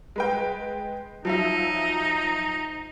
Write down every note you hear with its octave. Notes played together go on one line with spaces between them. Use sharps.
G#3 B4 G5
F3 F#3 D#4 E5